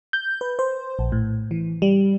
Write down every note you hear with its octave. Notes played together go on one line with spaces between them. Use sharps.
G6
B4
C5
A#1
A2
E3
G3